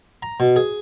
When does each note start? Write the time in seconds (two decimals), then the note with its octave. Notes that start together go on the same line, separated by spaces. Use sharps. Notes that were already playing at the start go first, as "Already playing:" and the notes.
0.23 A#5
0.40 B2
0.56 G#4